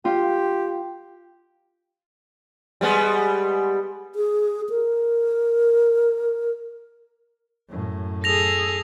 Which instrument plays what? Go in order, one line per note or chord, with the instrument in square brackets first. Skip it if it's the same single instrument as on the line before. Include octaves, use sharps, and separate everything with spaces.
[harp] F4 [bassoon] G4
[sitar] G3 G#3 B3
[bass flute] G#4
A#4
[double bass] F#2 A2
[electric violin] G#4 A4 [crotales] A#6 F7